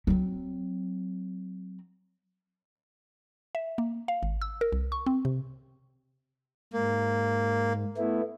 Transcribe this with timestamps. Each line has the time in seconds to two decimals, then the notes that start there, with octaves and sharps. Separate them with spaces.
0.07 F#3 C4
3.55 E5
3.78 A#3
4.08 F5
4.23 G#1
4.42 E6
4.61 A#4
4.72 C2
4.92 C#6
5.06 C4
5.25 C3
6.73 G#2 A#3
7.98 A3 B3 E4